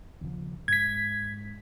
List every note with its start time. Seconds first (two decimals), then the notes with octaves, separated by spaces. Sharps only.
0.21 D#2 C#3 F3
0.68 G#2 G#6 B6